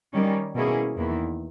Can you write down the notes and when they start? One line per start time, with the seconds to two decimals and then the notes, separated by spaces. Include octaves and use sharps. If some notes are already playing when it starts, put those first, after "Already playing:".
0.13 D#3 G3 C#4
0.55 B2 A#3 C#4 E4 G#4
0.97 E2 D#3 A#3 E4